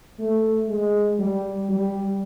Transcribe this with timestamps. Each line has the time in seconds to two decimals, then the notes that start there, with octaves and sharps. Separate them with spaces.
0.19 A3
0.69 G#3
1.19 G3
1.69 G3